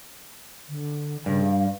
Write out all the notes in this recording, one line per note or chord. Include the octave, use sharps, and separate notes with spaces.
D3
G2 C#3
F5